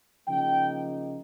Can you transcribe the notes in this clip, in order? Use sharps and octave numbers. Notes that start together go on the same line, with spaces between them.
C#3 F3 A#3 D#4 G5